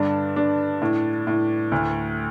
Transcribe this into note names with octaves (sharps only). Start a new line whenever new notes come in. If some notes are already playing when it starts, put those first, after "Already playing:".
Already playing: G2 D3 D4
D4
A2
A2
D2